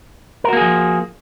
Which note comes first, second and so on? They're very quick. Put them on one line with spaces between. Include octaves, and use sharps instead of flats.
A#4 F#4 A#3 G#4 F3